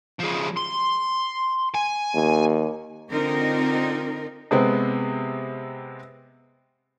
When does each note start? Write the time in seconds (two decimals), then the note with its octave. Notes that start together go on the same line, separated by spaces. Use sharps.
0.20 F3 G#3
0.57 C6
1.74 G#5
2.15 D#2
3.11 D3 C4 D#4 F4 A#4
4.51 C3 G#3 B3 C4